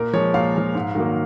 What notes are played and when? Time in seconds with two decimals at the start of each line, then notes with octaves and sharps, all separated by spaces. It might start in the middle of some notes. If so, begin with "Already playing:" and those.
Already playing: A#2 A#4
0.13 F3 G#3 C#5
0.34 A#2 F5
0.55 F3 G#3
0.75 G#2
0.95 D#3 F#3 A#3